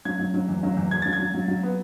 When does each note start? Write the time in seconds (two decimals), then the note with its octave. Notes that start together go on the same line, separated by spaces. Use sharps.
0.05 F#3 G#6
0.19 F#3
0.34 F#3
0.49 E2
0.63 F#3
0.77 E2
0.91 E2 G#6
1.02 F#3 A6
1.13 G#6
1.20 F#3
1.34 F#3
1.48 F#3
1.63 B3